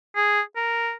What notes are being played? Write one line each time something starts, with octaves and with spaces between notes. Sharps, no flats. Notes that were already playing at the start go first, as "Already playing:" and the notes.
G#4
A#4